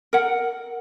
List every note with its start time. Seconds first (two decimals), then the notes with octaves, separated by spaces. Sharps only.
0.13 A#4 F#5